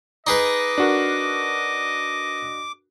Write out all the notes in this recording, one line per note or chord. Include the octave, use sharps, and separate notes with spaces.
D#4 G#4 B4 D#5 D6
D4 F#4 A#4